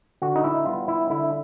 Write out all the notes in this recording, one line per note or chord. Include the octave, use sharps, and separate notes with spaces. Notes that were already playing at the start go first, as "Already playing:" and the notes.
D3 F#4
D#4
E4
G3 B3 F4
E4
D3 E4